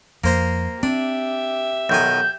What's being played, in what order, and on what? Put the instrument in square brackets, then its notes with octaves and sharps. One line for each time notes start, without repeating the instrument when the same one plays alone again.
[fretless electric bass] F2 [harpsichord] A#3 C5 A#5
[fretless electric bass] C4 [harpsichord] D4 [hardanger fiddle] G4 E5
[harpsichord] B1 D#3 G#5 [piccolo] G6